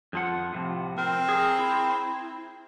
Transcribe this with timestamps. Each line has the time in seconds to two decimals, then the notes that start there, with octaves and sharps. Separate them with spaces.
0.13 F2 F3 F#5
0.53 A2 C3 F3
0.98 C4 A#4
1.29 G#4 A#4
1.59 E4